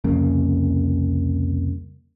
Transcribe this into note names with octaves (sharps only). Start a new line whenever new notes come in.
C2 F2 C#3 A#3